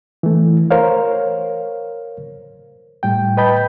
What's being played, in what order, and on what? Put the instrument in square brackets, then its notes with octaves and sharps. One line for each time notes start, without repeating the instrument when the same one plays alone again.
[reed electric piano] E3 A3
A#4 C5 C#5 F5
A2 G3 G5
B4 D#5 G5 A5 B5 G6